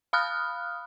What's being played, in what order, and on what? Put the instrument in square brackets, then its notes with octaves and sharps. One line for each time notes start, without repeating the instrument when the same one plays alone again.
[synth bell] F5 B5 D#6 F6 F#6